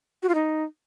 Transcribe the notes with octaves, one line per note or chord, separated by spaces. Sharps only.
F#4
F4
D#4